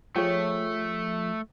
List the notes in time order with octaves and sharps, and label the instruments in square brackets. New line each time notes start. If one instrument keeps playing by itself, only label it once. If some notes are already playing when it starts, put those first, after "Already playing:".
[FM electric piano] F3 [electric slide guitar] A3 [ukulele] G4 G#4 C#5